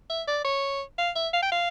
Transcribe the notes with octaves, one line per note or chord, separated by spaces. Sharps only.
E5
D5
C#5
F5
E5
F5
G5
F5